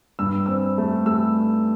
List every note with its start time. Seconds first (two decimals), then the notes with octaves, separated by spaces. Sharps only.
0.19 G2 E6
0.46 C4 E6
0.78 A3
1.06 A3 E6